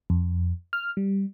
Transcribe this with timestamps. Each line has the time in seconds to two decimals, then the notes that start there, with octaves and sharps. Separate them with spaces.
0.10 F2
0.73 F6
0.97 G3